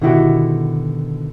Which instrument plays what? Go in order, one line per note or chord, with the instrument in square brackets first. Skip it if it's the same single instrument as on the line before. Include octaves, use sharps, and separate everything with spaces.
[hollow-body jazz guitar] B2 D3 D#3 E4 F#4 G4